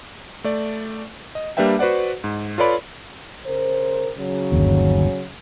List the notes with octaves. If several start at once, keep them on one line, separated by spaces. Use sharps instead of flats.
A3 D5
D#5
G3 A#3 D4 B4 E5 G5
F#4 B4 C5 D5 F#5
G#2
F4 A4 B4 C#5 D5 B5
C#3 A#4 C5
C#3 F#3
G1 D#2